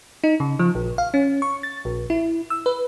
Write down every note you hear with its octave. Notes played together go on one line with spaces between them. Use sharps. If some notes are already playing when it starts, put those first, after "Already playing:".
D#4
C#3
F3
A#1
F5
C#4
C#6
A6
A#1
E4
E6
B4